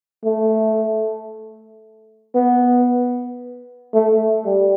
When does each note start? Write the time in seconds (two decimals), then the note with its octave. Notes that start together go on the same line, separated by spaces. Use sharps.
0.24 A3
2.35 B3
3.93 A3
4.45 G3